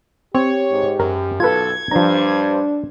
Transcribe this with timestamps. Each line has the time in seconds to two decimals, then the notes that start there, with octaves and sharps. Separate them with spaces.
0.35 C4 G4 C#5
0.70 G#2
1.00 F#2 A#4
1.40 B1 F4 A4 B4 G#6
1.91 G2 F3 D4 C5 A#5